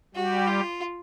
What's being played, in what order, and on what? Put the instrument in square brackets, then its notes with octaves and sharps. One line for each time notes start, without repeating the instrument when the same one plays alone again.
[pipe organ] G3 G4 [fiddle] F#4
[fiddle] F4